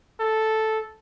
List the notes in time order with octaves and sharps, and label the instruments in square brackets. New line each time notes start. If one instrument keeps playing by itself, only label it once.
[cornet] A4